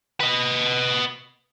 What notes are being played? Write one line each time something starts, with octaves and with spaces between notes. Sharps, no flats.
B4 D#5